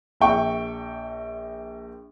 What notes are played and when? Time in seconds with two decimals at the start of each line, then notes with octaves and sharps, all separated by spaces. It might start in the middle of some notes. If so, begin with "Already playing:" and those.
0.21 A#1 E5 G5 C#6